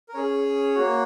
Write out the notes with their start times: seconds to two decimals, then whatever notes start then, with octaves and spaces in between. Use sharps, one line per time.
0.09 A#4
0.14 C#4 G#4 C#5
0.75 A#3 F#4